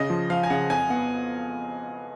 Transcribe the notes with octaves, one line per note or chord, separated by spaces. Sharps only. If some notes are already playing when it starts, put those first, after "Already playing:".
Already playing: C#3 D#5
F3
F3 F5
G#5
C#3 F#5
F2 G#5
B3 F#5